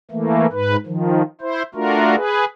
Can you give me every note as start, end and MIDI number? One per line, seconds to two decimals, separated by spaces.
0.11 0.46 52
0.11 0.46 57
0.11 0.46 58
0.52 0.76 44
0.52 0.76 71
0.86 1.22 51
0.86 1.22 53
1.41 1.62 64
1.41 1.62 72
1.75 2.16 57
1.75 2.16 62
1.75 2.16 65
1.75 2.16 66
1.75 2.16 70
2.16 2.45 68
2.16 2.45 71